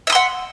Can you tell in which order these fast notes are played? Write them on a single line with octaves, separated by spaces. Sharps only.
E5 D#6 C6 F#5